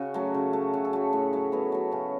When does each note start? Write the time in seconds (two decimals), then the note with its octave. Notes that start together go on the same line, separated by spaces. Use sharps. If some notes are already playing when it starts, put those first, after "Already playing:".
Already playing: C#3 F#4
0.14 F#3 A3
0.34 C#3
0.53 A3
0.73 C#3 F#4
0.85 A4
0.93 A3 F#4
1.13 A2
1.33 F#3 A3
1.52 A2 B3
1.72 F#3 A3
1.92 C#3 C#4